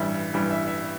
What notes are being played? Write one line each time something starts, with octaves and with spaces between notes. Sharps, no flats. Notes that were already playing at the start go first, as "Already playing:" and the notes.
Already playing: A1 G2 E3 G3 E5
A1 G2 E3 G3
E5
E5